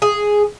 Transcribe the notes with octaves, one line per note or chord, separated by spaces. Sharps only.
G#4